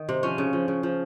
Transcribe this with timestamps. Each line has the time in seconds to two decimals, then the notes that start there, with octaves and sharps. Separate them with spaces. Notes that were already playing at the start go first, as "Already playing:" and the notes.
Already playing: D#3
0.09 C3
0.23 F3 C#4
0.38 C#3
0.53 F3
0.68 C#3
0.83 F3